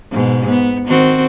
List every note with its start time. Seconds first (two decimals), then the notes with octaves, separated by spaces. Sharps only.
0.11 G#2 B2
0.50 B3
0.86 D#3 C4 F#4